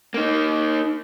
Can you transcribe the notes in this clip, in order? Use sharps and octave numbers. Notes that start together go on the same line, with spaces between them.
A#3 D#4